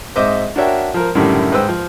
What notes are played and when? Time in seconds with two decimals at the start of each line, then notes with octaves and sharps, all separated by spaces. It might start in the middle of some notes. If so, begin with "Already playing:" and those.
0.16 G#2 C4 C5 D#5 E5 D6
0.56 D4 F#4 A#4 C#5 E5 G5
0.94 F3 A#4
1.15 F#2 A2 D3 D#3 G3 E4
1.52 G#2 B4 C5 G5 E6
1.68 F3